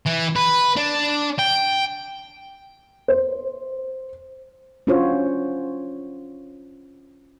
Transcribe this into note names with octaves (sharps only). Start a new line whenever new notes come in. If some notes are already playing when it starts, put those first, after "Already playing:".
E3
B4
D4
G5
C5
C#4 D4 F4 F#4 C5 C#5